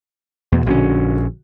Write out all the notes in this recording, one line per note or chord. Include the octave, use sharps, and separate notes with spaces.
E2 B2
A#1 D3 C4 C#4 F#4